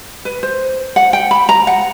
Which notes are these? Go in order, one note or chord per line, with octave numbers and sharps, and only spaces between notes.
B4
C5
F#5
G5
B5
A#5
F#5